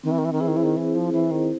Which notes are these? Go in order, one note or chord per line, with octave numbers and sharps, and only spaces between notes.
D#3 C4
E3
D#3
E3
D#3
E3 E4 G#4 C5
D#3
E3
D#3
E3 C4
F3
E3 E4 G#4 C5
D#3